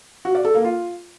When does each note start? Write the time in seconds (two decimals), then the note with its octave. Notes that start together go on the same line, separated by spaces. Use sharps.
0.25 F#4
0.35 D5
0.45 A4
0.54 A#3
0.64 F4